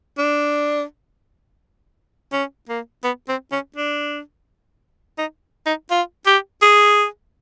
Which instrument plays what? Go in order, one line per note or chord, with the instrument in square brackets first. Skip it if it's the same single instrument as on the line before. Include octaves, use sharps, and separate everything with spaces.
[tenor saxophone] D4
C#4
A#3
B3
C4
C#4
D4
D#4
D#4
F4
G4
G#4